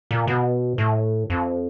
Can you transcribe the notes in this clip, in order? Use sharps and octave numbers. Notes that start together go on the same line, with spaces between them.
A#2
B2
A2
F2